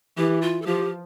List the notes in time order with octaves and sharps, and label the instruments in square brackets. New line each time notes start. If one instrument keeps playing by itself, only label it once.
[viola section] E3 [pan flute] G4
[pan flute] F4
A4
[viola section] F3 [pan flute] G4